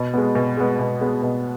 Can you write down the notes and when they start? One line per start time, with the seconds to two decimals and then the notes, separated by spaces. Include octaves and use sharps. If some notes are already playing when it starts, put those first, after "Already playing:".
Already playing: B2
0.14 G#3 B3
0.35 B2
0.57 G#3 B3
0.79 B2
1.01 G#3 B3
1.22 B2